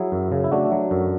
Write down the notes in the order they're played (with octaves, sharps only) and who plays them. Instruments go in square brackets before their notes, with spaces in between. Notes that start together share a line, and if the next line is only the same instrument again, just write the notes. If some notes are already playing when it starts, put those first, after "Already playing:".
Already playing: [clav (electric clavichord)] F#3 E4 G#4
F#2
C#3
E4
A3 D4 F#4
F#3
F#2